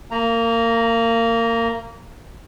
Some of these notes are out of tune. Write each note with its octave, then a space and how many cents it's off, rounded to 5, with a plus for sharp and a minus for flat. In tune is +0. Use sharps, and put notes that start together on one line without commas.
A#3 -25 A#5 +0